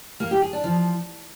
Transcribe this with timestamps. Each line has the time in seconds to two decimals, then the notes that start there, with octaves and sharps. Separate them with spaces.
0.20 A#3
0.31 G4
0.42 G#4
0.53 D4
0.64 F3